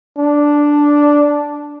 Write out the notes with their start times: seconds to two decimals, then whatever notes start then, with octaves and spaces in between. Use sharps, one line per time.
0.18 D4